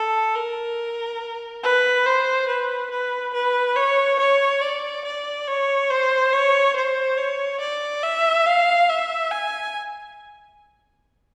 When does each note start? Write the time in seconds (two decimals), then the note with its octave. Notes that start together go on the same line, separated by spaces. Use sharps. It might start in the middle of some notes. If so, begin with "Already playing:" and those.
Already playing: A4
0.35 A#4
1.63 B4
2.06 C5
2.48 B4
2.91 B4
3.34 B4
3.76 C#5
4.19 C#5
4.62 D5
5.05 D5
5.48 C#5
5.90 C5
6.33 C#5
6.76 C5
7.18 C#5
7.60 D5
8.03 E5
8.46 F5
8.89 E5
9.31 G#5